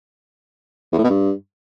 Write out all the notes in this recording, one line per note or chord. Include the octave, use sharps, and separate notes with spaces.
E2
A2
B2
G2